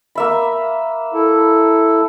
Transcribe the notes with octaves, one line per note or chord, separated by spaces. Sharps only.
A#3 E5 B5
E4 A4